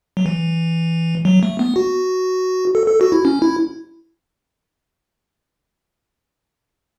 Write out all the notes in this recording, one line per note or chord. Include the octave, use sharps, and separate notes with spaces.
F#3
E3
F#3
A3
B3
F#4
A4
A4
F#4
E4
C#4
E4